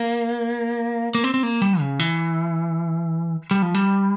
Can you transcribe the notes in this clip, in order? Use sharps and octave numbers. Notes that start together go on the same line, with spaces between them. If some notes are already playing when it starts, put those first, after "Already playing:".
Already playing: A#3
A#3
C4
C4
A#3
G3
C#3
E3
G3
F3
G3